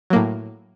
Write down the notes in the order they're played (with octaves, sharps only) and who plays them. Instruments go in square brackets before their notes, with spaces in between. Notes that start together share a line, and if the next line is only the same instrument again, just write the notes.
[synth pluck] F#3
A#3
A2